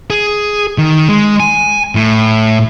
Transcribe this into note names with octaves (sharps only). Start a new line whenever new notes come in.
G#4
D#3
G#3
G#5
A2